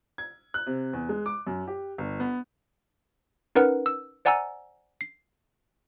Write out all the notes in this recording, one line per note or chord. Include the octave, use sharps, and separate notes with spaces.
G#6
F#6
C3
E2
G#3
D6
F#2
G4
G1
B3
C#4 D#4 A#4 B4 F#5 F6
E6
C5 D5 F#5 G#5 A#5 E6
C7